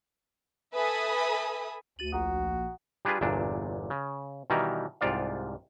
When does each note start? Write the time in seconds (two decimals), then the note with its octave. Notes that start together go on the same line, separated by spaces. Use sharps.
0.75 A4 B4 E5 G#5 B5 D#6
1.99 D2 F#4 A6 D#7 F#7
2.12 A#1 F#4 F#5 A#5 D#6
3.05 G3 D4 F4 G#4 B4
3.21 G1 E2 A#2 D4
3.90 C#3
4.50 B2 D#3 E3 G3 A#4
5.01 C2 G#2 F4 D5 F5